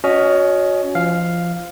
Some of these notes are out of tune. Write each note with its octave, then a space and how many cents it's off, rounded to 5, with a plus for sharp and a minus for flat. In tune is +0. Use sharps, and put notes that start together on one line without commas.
C#4 +20 F#4 -15 D#5 +0
F3 -20 F5 +0